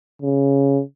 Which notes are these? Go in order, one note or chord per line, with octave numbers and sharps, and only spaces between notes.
C#3